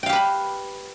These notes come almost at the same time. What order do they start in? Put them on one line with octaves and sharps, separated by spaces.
G5 F5 G4 B4 B5